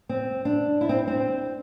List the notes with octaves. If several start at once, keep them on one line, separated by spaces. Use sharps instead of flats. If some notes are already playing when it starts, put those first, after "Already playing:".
C4
D4
E4
C4
C4